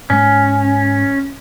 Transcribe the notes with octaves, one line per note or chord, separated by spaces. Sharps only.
G#2 G#3 C#4